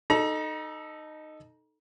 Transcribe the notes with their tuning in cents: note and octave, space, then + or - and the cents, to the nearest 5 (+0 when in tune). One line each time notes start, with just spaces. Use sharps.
D#4 -10 A4 +0 A#5 +35